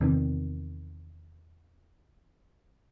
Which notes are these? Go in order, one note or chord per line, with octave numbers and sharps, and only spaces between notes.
E2 C3 D#3